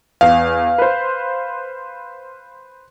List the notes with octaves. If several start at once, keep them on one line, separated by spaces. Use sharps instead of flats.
E2 F5
B4 C5